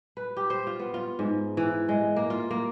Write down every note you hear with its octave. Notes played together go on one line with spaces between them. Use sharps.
B4
G4
C5
F4
B3
F4
G#2
E3
G#3
A#3
F4
A#3